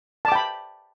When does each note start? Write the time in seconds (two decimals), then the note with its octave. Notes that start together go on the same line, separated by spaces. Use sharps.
0.25 A5
0.28 D6
0.32 G5
0.35 B5